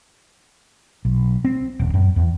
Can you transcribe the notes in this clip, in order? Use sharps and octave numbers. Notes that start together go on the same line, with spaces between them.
B1
C4
D#1
F#2
E2